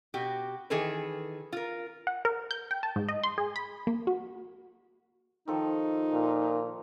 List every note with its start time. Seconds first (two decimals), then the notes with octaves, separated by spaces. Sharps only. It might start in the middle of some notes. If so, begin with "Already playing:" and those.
0.14 B2 F#4 G4
0.70 D#3 E3 G#4 A4 B4
1.53 F4 A#4
2.07 F#5
2.25 A#4
2.51 G6
2.71 G5
2.83 A5
2.96 G#2
3.09 D#5
3.23 C6
3.38 G#4
3.56 B5
3.87 A#3
4.07 F#4
5.48 D#3 F3 D#4 A4
6.13 A#2